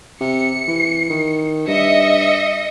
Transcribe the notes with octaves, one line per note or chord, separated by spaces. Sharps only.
C3 C#7
E3
D#3
G2 D#5 E5 C#7